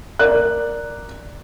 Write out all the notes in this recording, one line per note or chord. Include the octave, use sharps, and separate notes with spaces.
A#4 D5 F#6